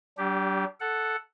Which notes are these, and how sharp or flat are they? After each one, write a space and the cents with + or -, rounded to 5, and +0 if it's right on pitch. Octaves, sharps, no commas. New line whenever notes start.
G3 -45 D4 -15 G4 +0
A4 +0 F#5 +0